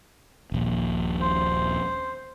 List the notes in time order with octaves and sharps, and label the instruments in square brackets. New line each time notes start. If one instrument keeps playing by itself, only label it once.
[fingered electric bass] D#1 A#1
[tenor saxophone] C5